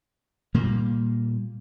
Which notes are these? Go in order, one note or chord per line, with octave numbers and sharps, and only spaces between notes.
A#2 G3 A#3